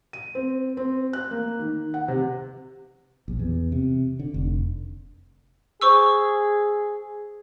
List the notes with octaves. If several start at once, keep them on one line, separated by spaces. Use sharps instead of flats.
D#7
C4
C4
F#6
A#3
D#3
F#5
C3
A#1
E2
C3
D3
F1
G#4 C5 C#6 E6